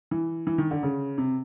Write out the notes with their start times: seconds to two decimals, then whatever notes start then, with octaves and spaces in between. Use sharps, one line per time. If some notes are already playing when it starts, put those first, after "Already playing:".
0.11 E3
0.47 E3
0.58 D#3
0.71 D3
0.83 C#3
1.18 C3